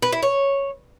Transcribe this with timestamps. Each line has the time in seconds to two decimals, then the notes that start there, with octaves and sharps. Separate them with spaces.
0.02 B4
0.12 E4
0.23 C#5